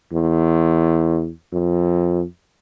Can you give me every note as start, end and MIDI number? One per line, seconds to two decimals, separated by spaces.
0.13 1.30 40
1.53 2.24 41